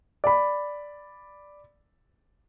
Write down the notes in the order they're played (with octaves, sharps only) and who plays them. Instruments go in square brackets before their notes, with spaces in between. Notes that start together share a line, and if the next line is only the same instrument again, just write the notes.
[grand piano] D5 B5